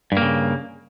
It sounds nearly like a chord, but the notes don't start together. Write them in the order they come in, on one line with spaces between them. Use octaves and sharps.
G2 A#3 C#3